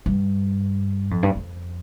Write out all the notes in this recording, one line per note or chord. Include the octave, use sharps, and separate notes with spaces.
G2
F2
G2
F2